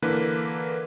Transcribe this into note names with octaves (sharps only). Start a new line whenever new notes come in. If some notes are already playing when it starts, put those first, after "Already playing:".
D3 E3 A#3 B4